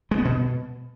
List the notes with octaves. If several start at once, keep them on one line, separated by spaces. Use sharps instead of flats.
G#3
B3
B2